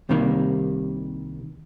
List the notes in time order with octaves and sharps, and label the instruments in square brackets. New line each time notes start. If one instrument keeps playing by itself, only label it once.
[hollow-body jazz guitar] C2 C3 D#3 G3 A#3